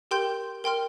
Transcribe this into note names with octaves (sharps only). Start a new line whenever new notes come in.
G4 A#4 G5 C6 G6
A#4 G5 C6 F6